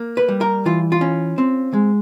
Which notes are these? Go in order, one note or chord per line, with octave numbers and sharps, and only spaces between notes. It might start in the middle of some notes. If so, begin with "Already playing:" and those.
Already playing: A#3
B4
G3
A#4
E3 F4
F4
C#4
C4
G#3